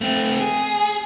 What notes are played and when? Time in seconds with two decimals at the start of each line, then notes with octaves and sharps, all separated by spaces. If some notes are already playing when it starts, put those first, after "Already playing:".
0.01 A3 C4
0.40 G#4